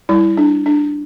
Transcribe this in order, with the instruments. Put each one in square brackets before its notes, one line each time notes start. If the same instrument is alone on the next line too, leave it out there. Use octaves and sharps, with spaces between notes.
[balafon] G3 E4
D4
D4